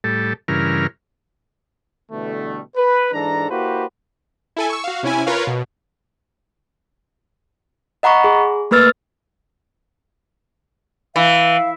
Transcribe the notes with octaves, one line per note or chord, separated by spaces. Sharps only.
A2 G3 A4
G2 C#3 E3 A#4 F6
B2 D3 E3 G3 A3
B4
G#2 E3 D4 A4 A#5
A#3 E4 F#4 G4 B4 C5
E4 A4 G#5
C#6 E6
F#4 F5
C3 C#4 E4 G#5
F4 A#4 B4 C#5 F5
B2
D#5 F#5 A#5 B5 C#6
G#4
A3 A#3 B4 E6 F6 A6
E3 F5